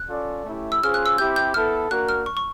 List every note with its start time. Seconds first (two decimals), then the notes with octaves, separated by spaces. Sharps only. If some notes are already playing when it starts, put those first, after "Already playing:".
Already playing: F#6
0.09 C#4 F4 A4 D5
0.45 A3 C#4 E4 G4
0.72 E6
0.82 C#4 F4 G#4 C5 F6
0.94 F#6
1.06 E6
1.18 C4 E4 G4 G6
1.36 G6
1.54 B3 E4 A4 F6
1.90 A#3 D4 F#4 A#4 F#6
2.09 F6
2.26 C#6
2.37 C#6